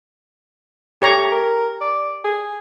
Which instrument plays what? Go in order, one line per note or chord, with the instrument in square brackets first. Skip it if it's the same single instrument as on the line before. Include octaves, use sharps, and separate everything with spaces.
[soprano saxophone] A3 [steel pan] G4 C#5 A#5
[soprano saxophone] A#4
D5
G#4